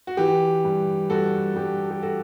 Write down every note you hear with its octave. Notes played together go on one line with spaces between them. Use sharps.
F#4
E3 G4
G2
G2 F#4 A4
G2 G4
G4
F#4 A4